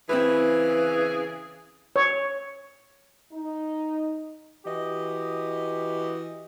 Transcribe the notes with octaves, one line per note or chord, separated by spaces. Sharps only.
C#3 E3 C4 E4 G#4 B4
C#5
D#4
E3 F#4 G4 D#5